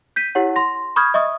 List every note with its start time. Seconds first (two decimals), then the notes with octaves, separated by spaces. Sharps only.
0.16 G6 B6 D#7
0.35 E4 G4 C#5 F#5
0.56 C6 A#6
0.96 B5 C#6 D#6 F6 G6 G#6
1.14 D#5 E5 C#6 D#6